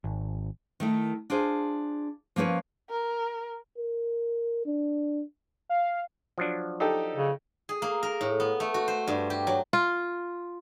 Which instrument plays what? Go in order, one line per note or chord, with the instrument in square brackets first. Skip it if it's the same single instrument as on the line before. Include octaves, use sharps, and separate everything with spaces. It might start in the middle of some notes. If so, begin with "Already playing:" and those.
[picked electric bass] G#1
[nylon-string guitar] D#3 A3 E4
D4 F4 G#4 C5
F3 A#3 C#4 B4 C#5
[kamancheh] A#4
[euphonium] A#4
D4
[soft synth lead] F5
[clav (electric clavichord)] F3 F#3 D4
[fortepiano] D#4 G4 A4
[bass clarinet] C#3
[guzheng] G#4
A#3
A#4
A2
B3
A3
F#4
C5
G2
G4
F#3
[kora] F4